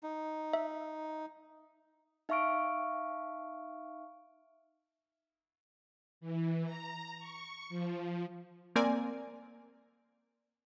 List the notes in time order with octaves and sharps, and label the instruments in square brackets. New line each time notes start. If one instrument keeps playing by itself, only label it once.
[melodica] D#4
[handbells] E5
[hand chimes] D#4 E5 F5 C#6 F6 D7
[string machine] E3
A#5
C#6
F3
[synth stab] A#3 C4 A#4 D5 G#5